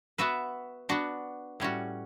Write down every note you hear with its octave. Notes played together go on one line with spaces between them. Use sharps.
B3 F#4 B4 E5
B3 D4 F#4
A2 G3 C#4 F#4